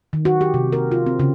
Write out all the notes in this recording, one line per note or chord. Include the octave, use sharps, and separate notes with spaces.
D#3
F#4
G4
C3
A#4
F4
C4
C#3